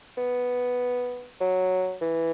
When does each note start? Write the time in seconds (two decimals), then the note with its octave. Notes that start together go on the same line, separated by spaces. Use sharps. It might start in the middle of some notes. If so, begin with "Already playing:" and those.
0.18 B3
1.40 F#3
2.01 E3